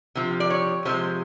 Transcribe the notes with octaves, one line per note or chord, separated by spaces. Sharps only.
C3 F3
D5
C#5
C3 F3 G#3 C5